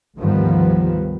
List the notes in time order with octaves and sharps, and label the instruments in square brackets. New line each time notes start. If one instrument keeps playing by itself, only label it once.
[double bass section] D2 G#2 D#3 F3 G3 B3